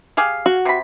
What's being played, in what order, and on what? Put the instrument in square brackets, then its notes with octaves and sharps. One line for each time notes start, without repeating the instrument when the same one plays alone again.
[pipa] G4 G#4 F5
[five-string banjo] F#4
[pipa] C3 B5